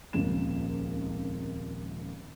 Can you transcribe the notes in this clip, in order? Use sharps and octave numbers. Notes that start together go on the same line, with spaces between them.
D#1 G#1 C#2 F3 A#3 E7